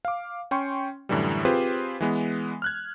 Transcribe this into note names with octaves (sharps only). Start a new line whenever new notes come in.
F5 D6
C#4 G5 C6 C#6
F#2 A2 D3 E3 G3
C4 F4 G4 G#4 B4 C5
E3 G#3 B3
F6 F#6 G#6